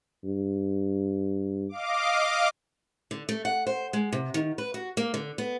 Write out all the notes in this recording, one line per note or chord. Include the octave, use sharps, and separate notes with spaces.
G2
D#5 F5 D6
D3
A3
F#5
C5
G#3
C3
D#3
B4
F#4
A#3
D3
B3